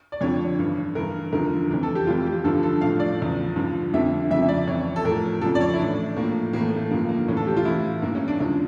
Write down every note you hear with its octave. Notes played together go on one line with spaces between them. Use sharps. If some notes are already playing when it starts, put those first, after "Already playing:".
D5
F2 D3 F3 C#5
G2 E3
G2 E3 A#4
E2 D3 F3 A#4
F2 E3
A4
G4
F2 E3 F4
G4
G2 D3 F3 A4
A4
A2 F3 F5
D5
E2 C#3 F3
G2 D3 F3
F2 D3 F3 E5
F2 C#3 F3 E5
E5
D5
F2 E3 C#5
A4
A2 F3 A#4
F2 C#3 F3 A4
D5
C#5
E4
A2 E3 D4
A2 F3 A#3
A2 E3 A#3
A3
A3
G2 D3 F3 A#3
A#3
A2 E3 C#4
A4
G4
F4
A2 E3 E4
G2 E3 A#3
C#4
D4
E2 D3 F3 C#4